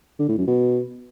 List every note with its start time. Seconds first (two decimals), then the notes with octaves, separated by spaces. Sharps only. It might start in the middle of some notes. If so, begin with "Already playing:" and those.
0.19 D3
0.29 A2
0.38 F#2
0.47 B2